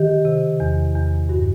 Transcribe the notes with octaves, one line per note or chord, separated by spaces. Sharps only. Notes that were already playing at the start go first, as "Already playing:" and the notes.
Already playing: D#3 G4
C3
E2
E2
G2 F#4